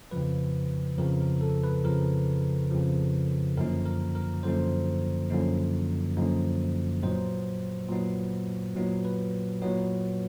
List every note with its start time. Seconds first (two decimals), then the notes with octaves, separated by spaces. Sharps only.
0.11 F2 C#3 F3 B4
0.98 F2 C#3 F3 A#4
1.21 A#4
1.41 A4
1.64 B4
1.84 F2 C#3 F3 A#4
2.71 F2 C#3 F3
3.57 F#2 D3 F3 A#3 D#4 A#4
3.86 A#4
4.15 A#4
4.43 F#2 D3 F3 A#3 D#4 C5
5.30 F#2 D3 F3 A#3 D#4
6.17 F#2 D3 F3 A#3 D#4
7.03 A#2 F#3 B3 D#4 C5
7.89 A#2 F#3 B3 D#4
8.76 A#2 F#3 B3 D#4
9.05 B4
9.62 A#2 F#3 B3 D#4 C#5